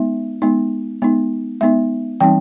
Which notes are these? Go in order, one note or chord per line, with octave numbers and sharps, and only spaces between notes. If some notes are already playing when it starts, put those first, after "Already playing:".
Already playing: G#3 B3 D#4 E5
G#3 B3 D#4
G#3 B3 D#4
G#3 B3 D#4 E5
E3 G3 C4 D#4 G5